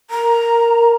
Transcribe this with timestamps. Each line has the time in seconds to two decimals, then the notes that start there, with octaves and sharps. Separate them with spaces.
0.10 A#4 A#5